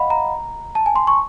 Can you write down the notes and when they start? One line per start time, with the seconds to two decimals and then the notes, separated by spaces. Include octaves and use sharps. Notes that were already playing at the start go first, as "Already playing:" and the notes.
Already playing: D#5 F5 F#5 B5
0.10 A#5
0.75 A5
0.86 G#5
0.96 C6
1.07 C#6